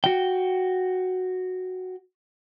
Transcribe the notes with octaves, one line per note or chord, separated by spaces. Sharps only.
F#4 G5